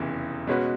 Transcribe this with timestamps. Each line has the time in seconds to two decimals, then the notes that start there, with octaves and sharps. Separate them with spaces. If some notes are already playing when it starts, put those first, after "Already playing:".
Already playing: F1 E2 C#3 E3
0.47 B2 G#3 C#4 F#4 B4